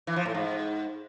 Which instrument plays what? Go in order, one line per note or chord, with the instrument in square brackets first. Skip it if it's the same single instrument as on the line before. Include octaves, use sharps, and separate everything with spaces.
[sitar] E3
F3
A2
G#2